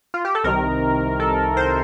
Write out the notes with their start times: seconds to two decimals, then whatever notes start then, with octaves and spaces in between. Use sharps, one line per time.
0.14 F4
0.25 G4
0.35 A4
0.44 C2 C3 D#3 A#4
1.20 A4
1.57 C5